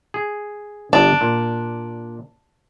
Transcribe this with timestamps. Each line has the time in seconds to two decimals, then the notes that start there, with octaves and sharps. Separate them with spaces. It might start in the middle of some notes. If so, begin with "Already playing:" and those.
0.14 G#4
0.93 G1 D4
1.21 A#2